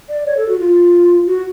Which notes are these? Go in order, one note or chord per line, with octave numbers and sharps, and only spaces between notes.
D5
C#5
A4
F#4
F4
F#4